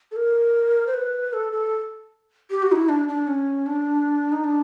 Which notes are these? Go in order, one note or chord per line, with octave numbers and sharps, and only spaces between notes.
A4
A#4
C5
B4
A4
A4
G4
F#4
D#4
E4
D4
D4
C#4
D4
D#4
D4